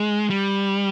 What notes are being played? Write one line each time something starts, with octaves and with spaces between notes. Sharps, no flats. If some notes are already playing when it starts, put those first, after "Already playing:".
Already playing: G#3
G3